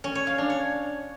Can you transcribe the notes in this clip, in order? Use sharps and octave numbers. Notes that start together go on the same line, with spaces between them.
C#4
C#5
F5
D4
C#5